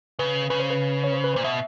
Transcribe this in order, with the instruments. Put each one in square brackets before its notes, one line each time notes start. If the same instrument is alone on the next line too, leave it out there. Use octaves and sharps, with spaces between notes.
[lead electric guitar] C#3 [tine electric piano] B4
[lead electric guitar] C#3 [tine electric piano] B4
[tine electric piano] C5
B4
C#5
C5
B4
[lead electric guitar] A#2 [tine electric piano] C5
[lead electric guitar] B2 [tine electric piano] E5